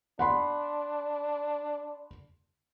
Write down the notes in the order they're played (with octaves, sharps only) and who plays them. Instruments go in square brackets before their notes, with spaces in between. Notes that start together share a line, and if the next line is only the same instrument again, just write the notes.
[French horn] D4 [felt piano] F#5 B5 C6